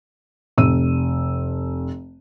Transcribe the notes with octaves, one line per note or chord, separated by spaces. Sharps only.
F1 E6 D#7